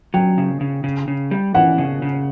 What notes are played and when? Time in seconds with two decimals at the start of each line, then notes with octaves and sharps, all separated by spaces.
0.14 F#3 G5
0.38 C#3
0.61 C#3
0.84 C#3
1.08 C#3
1.31 G3
1.55 E3 F#5
1.78 C#3
2.02 C#3